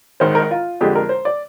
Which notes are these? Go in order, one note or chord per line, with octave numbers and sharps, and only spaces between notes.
G#1 G#2 D#3 C5
A#4
F4
F2 D3 G#3 G4
A#4
C5
D5